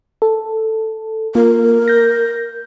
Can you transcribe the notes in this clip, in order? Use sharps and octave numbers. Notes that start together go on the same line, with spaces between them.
A4
A#3 F4 A#4
G6 A#6